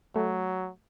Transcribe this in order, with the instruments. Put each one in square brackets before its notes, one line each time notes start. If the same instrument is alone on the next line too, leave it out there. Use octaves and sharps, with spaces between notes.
[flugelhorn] F#3 [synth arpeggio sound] A3